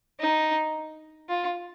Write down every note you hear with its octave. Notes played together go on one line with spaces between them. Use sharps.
D#4
F4